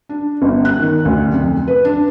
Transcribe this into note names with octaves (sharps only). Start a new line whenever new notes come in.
D4
G1
F#6
D#3
D2
F2
B4
D4